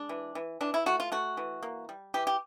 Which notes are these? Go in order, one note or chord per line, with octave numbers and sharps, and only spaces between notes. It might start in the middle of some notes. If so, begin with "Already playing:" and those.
Already playing: G#3 D4
E3
E3
E3 D4
E4
A3 F#4
F4
A3 F#4
E3
A#3
G3
E3 G4
G4